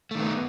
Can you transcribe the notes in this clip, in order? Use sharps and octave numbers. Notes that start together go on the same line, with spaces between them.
D#3 A3 B3